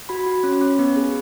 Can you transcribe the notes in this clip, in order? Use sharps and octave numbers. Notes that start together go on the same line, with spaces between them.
F#4 B5
F#4
C#4
C#4
B3
G#4